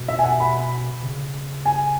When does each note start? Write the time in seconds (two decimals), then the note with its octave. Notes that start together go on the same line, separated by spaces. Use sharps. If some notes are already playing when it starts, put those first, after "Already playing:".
Already playing: B2
0.08 E5
0.19 G#5
0.24 F#5
0.40 B5
1.03 C#3
1.65 G#5